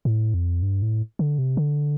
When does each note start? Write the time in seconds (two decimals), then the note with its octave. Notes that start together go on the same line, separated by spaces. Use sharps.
0.05 A2
0.34 F2
0.62 G2
0.82 A2
1.19 D3
1.38 C3
1.57 D3